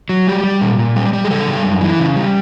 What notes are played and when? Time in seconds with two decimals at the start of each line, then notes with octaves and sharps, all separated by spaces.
0.09 F#3
0.27 G3 G4
0.44 G3
0.61 A#2
0.78 A#2
0.96 G3
1.13 G3
1.25 G#4
1.31 C#3 A4
1.48 G3
1.64 F#2
1.81 E3
1.99 C#3
2.16 G3